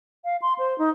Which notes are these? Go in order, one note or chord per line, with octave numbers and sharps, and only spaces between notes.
F5
C6
C5
D#4